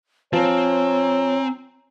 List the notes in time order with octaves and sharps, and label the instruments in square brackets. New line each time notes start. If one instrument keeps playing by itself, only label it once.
[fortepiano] F3 [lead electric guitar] C4 [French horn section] C#5 [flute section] G#5 A#5 E6